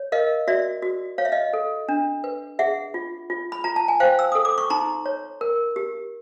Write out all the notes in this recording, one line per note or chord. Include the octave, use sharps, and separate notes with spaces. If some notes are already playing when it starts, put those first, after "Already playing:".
Already playing: C#5
A#4 D#5 F5
F#4 D5 E5
F#4
C#5 F5
E5
D#5 F5
A4
D4
B4
G#4 E5 F#5
F4
F4
B5
F4 A#5
A5
G#5
C5 F5 G5
E6
A4 D#6
D6
C#6
D#4 A#5 C6
C#5
A#4
G4